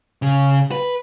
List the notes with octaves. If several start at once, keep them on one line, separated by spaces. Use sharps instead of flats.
C#3
B4